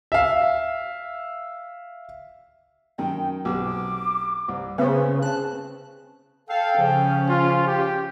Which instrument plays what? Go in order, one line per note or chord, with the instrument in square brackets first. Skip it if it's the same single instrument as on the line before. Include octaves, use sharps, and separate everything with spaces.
[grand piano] E5 F5
[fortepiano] F#2 D#3 [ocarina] G5
[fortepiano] B1 C3 [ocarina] D6
[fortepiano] C2
[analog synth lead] C#3 [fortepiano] B3 C5 [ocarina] B4
[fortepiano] C4 [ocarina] A5 [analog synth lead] F#6
[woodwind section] A4 F5 [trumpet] G5
[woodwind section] C#3 F3 C#4
[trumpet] F4
G4